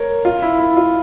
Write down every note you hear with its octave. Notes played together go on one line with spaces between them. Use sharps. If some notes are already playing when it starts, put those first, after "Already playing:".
Already playing: A#4 C#5
F4
E4
E4
F4